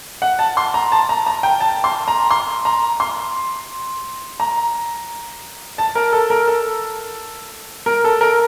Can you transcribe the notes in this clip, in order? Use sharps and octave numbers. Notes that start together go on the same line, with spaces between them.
F#5
A5
C6
A#5
A5
A#5
A#5
G5
A5
C6
A#5
C6
A#5
C6
A#5
A5
A#4
A4
A#4
A4
A#4
A4
A#4